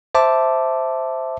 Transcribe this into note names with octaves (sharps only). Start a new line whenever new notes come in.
C5 E5 A5 D6